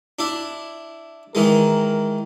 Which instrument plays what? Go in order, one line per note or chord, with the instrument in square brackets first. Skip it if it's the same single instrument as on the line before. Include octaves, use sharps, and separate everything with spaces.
[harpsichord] D4 E4
[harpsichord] D#3 E3 G#3 [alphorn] A#4